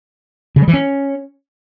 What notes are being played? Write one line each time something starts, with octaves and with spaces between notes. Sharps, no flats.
C#3
G3
E3
C#4